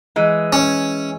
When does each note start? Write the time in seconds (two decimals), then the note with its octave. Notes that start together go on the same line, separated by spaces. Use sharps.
0.16 E3 G#3
0.53 C#4